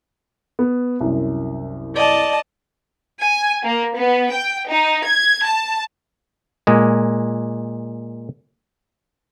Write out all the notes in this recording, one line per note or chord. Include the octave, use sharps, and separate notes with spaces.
B3
C2 F#2
D5 D#5 A5
G#5
A#3
B3
G5
D#4
G#6
A5
A#2 G#3